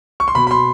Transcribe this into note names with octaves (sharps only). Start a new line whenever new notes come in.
C#6
C6
B2 B5
B5
C6